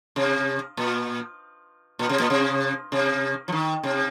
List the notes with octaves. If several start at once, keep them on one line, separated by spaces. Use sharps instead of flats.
C3
A#2
A#2
C3
A#2
C3
C3
F3
D#3
C3